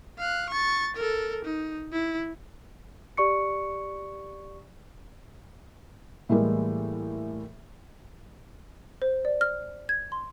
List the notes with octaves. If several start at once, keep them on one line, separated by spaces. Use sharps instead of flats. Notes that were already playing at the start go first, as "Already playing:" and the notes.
F5 F#6
C#6 A6
A4 A#4
D#4
E4
G4 D5 C#6 C#7
A2 E3 G3 G#3 A#3
C5
D5
F6
G#6
C6